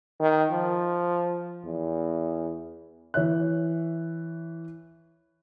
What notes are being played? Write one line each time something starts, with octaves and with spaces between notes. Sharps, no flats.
D#3
F3
E2
E3 C#5 E5 F#6